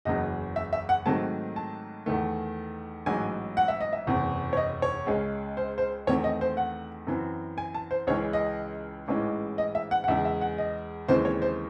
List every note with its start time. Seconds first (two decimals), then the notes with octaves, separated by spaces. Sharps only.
0.05 F#1 E2 C#3 F#3 D#5
0.56 E5
0.73 E5
0.89 F#5
1.06 G#2 D#3 F#3 A3 C4 A5
1.56 A5
2.06 E2 D#3 A3
3.06 A1 G#2 F#3 G#5
3.57 F#5
3.68 E5
3.81 D#5
3.93 E5
4.07 F#1 E2 C3
4.53 C#5
4.57 D#5
4.82 C#5
5.07 C#2 C#3 G#3 C#4
5.57 C5
5.78 C5
6.07 E2 D#3 A3 C4 C#5
6.24 D#5
6.41 C5
6.57 F#5
7.07 F#2 E3 C4
7.58 G#5
7.74 A5
7.91 C5
8.07 C#2 C#3 E3 G#3 C#4 C#5
8.33 D#5
9.08 A1 G#2 E3 G#3 C#4
9.58 D#5
9.75 E5
9.91 F#5
10.04 F#5
10.08 E2 C#3 G#3 E5
10.25 E5
10.41 F#5
10.58 D#5
11.08 D#2 C#3 E3 G#3 C4 C5
11.25 C#5
11.42 C5